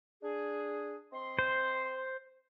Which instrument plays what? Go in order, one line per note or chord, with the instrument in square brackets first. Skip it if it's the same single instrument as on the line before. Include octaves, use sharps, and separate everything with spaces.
[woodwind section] D4 G#4
C4 D#5 C6
[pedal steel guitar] C5